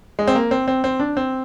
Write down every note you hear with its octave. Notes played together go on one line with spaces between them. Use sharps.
G#3
C4
A#3
C4
C4
C4
D4
C4